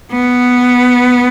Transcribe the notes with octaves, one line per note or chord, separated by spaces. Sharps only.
B3